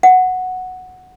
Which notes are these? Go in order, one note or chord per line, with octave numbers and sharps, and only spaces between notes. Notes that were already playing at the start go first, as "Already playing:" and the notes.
F#5